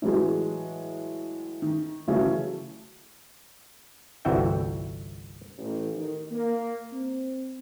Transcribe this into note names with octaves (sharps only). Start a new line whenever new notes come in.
A2 E3 F#3 G#3
D#3
C#3 E3 F#3 A3 C#4
G1 C2 E3 F#4 E5 G5
A1
D#3
A#3
C4